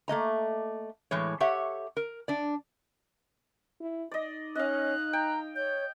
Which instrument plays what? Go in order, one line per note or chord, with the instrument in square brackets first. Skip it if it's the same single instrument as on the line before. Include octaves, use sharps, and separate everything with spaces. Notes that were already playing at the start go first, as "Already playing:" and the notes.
[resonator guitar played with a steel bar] A3 A#3 D#5 A#5
A2 E3 G#3 C#5
G4 A4 C#5 E5 F#5
A#4
D4 D5
[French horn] E4
[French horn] D#4 [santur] D5 D#5
[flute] C#4 [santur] D#5 F5 [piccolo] F#6
[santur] G5 [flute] A#5
[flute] C#5 [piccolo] G6